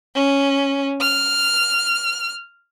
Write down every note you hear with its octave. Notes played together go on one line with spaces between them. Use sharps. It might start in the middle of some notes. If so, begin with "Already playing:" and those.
C#4
F6